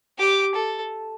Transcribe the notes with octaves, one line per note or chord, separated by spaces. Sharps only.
G4 D6
A4